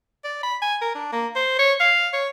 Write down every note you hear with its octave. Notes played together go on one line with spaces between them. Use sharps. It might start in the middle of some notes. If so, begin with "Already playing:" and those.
D5
B5
G#5
A#4
D4
A#3
C5
C#5
F5
C#5